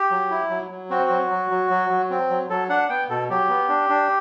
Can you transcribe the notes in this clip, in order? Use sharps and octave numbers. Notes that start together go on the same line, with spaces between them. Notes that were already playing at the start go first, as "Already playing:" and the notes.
Already playing: G4
F#3
E4
F#3
F#3
C4 F#4
F#3
F#3
F#3
F#3
F#3
C4
F#3
F#3 A4
D4 F#5
B3 G5
B2 A4
F#3 G4
B3
D4
D4